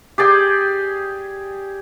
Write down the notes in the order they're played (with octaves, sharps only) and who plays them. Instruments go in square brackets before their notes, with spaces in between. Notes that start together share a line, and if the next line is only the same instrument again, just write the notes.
[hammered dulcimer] G4 G#4 D5 G5